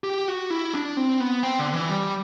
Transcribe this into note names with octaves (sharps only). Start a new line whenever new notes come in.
G4
F#4
E4
D4
C4
B3
C4
D3
E3
G3